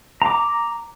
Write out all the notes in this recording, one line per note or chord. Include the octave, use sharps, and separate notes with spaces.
A#5 D6